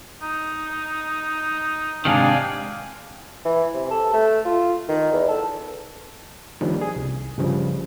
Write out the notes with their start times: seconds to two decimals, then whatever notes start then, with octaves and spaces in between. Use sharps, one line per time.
0.22 D#4
2.05 G#2 C3 D#3 D4 F5 G5 G#5
3.45 E3
3.74 C3
3.91 A4
4.13 A3
4.46 F4
4.89 D#3
5.13 E2
5.29 A4
6.61 D#3 F3 G3 A#3 C#4 D4
6.81 G#4
6.96 C2
7.38 G2 C#3 F3 G3